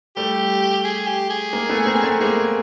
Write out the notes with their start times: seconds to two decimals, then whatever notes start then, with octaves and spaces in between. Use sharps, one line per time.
0.16 G3 A3 G4
0.84 G#4
1.07 G4
1.30 G#4
1.53 G#3 A#3
1.69 A3 B3
1.86 A#3 C4
2.04 A3 B3
2.20 G#3 A#3 G#4